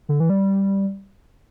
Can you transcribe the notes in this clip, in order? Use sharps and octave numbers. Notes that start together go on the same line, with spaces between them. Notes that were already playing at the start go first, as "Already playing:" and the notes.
D3
E3
G3